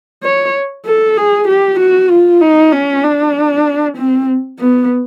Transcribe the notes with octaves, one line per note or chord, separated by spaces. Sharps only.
C#5
A4
G#4
G4
F#4
F4
D#4
C#4
D4
C4
B3